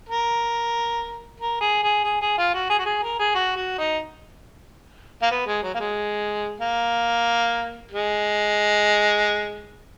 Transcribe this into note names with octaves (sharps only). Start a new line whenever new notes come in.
A#4
A#4
G#4
G#4
G#4
G#4
F4
F#4
G#4
F#4
G#4
A#4
G#4
F#4
F#4
D#4
A#3
B3
G#3
F#3
A#3
G#3
A#3
G#3